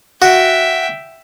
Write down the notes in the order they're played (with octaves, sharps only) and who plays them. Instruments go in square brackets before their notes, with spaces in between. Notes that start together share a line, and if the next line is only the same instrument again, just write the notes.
[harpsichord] F#4 [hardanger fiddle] E5 G5